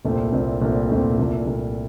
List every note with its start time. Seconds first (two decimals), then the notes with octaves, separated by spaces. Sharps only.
0.05 C2 A#2 A3 C4
0.32 C2 A#2 A3 C4
0.61 C2 A#2 A3 C4
0.89 C2 A#2 A3 C4
1.19 C2 A#2 A3
1.47 C2 A#2 A3